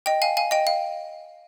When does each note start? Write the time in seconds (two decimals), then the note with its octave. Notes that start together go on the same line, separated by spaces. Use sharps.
0.06 D#5 G5
0.22 F5 G#5
0.37 F5 G#5
0.51 D#5 G5
0.67 F5